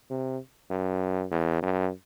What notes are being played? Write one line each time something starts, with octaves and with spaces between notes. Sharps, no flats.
C3
F#2
E2
F#2